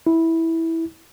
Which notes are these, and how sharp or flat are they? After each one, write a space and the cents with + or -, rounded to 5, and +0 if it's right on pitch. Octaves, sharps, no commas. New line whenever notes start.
E4 -10